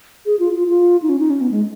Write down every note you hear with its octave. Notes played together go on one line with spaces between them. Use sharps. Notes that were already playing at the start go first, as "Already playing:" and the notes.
G#4
F4
F4
F4
D#4
C#4
D#4
C#4
B3
G#3